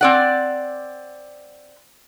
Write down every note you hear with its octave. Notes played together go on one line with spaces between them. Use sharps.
C4 D5 F#5